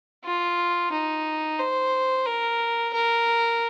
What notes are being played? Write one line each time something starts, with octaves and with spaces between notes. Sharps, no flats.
F4
D#4
C5
A#4
A#4